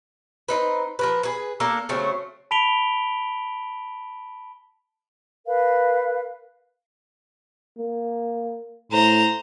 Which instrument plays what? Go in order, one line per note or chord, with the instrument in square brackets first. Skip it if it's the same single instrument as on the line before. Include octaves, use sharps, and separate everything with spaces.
[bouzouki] C4 D#4 B4
F3 A#4 B4
G#4 B4
A#3 D4 A4 A#4
C#3 F#3 A3 C4
[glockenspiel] A5 B5 B6 D7 F7 G7
[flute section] A#4 B4 F5
[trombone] A#3
[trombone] A2 [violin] C5 A#5